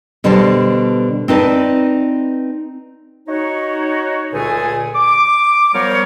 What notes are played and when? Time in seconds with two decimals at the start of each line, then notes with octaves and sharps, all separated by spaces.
0.24 B2 D3 G3 B4 C5 A5
1.28 C4 D#4 B4 D5 A5
3.28 D#4 F#4 C#5
4.33 C#2 A#2 D3 A3 G#4 G#5
4.94 D6
5.73 F3 G3 B3 A#4 C5 C#5